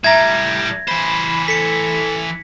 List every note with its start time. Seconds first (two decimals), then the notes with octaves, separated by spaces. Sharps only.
0.04 A2 G3 E5 A#5 G#6 A#6
0.88 E3 C5 B5
1.48 A4 B6 C#7